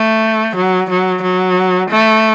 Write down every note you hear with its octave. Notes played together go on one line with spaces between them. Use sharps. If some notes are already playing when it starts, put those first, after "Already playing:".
Already playing: A3
F#3
F#3
F#3
A3